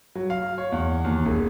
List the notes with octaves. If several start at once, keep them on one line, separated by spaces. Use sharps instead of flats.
F#3
F5
C#5
E2
D#2
E1